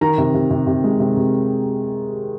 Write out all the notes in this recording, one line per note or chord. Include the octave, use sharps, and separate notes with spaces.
D#3 A#5
C3
C3
C3
C3
G#3
C3
C3